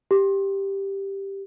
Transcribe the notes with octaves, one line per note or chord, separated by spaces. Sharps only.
G4